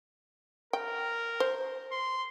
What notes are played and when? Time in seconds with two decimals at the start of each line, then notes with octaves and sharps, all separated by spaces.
0.73 A#4 G5
1.40 C5
1.92 C6